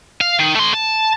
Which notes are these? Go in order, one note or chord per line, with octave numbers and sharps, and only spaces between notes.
F5
D#3
A3 C6
A5